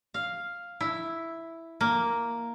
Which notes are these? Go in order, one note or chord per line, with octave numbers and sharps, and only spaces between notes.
F5
E4
A#3